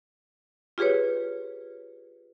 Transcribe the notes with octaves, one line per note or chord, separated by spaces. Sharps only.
F4 G4 G#4 B4 C#5